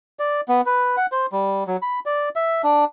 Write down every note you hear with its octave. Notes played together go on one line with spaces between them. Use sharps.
D5
B3
B4
F#5
C5
G3
F#3
B5
D5
E5
D4